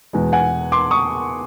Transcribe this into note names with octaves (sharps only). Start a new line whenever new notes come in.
E2 B2 G#3
F#5 G#5
C6 D6
C#6 D#6